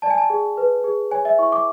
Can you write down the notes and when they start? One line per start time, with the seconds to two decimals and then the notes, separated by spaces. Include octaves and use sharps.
0.02 D5 A5
0.10 G#5
0.18 A5
0.30 G#4
0.57 B4
0.84 G#4
1.11 C#5 G#5
1.25 E5
1.39 E4 C#6
1.52 D6